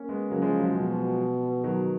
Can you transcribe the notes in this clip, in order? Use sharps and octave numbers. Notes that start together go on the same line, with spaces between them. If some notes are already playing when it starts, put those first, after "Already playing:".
Already playing: A#3 C#4
G#3 B3
C#3 F#3 A#3
F3 G#3
F#3
F3
B2 F3
D#3 F#3